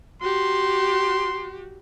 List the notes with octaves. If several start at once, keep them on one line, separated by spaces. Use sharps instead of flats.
F#4 G4 C6